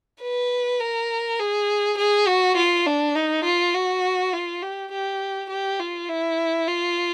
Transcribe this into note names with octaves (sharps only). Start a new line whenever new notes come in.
B4
A#4
G#4
G#4
F#4
F4
D4
D#4
F4
F#4
F4
G4
G4
G4
F4
E4
F4